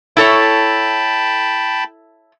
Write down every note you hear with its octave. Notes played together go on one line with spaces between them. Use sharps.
E4 A4 C#5 G5 A5 B5